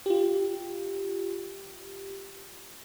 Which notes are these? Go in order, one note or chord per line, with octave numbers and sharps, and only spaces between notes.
F4 G4